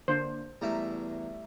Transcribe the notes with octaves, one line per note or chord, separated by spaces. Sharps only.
D3 A#3 D4 C5
E2 G3 A3 E4 A#5